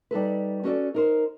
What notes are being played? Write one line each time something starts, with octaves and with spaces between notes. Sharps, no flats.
G3 D#4 A4 B4
C#4 F#4 A4 D5
D#4 A#4 C5